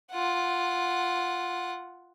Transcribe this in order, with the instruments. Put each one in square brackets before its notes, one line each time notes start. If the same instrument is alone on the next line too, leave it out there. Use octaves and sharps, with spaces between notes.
[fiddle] F4 F#5